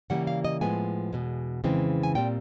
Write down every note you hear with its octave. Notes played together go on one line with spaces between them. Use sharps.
C#3 E3 G3 A#3 F#5
F5
D#5
A2 F3 G#3 B3 G#5
E2 B2 G#3
F2 C#3 E3 G#3 C4
G#5
A#2 G3 C4 G5